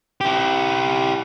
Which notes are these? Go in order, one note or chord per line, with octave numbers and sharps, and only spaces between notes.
E4 G4